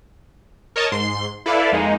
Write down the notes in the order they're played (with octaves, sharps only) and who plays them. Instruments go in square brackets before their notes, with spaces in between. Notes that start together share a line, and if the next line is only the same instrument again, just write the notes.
[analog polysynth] A#4 C#5 D#5 A5
G#2 C6
E4 A4 B4 D5 F5
F2 G#3 A#3 D#4